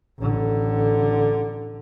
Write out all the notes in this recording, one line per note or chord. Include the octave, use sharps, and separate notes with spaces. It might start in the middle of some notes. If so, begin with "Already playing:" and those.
A1 D3